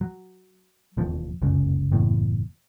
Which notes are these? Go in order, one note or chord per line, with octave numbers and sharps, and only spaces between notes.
F#3
E1 D#2 F3
F1 C#2 F#2 C#3
F#1 E2 A2